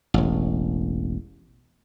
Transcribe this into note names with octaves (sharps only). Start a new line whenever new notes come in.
E1 A1